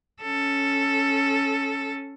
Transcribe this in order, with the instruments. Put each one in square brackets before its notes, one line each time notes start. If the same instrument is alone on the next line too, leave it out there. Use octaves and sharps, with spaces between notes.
[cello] C#4 A4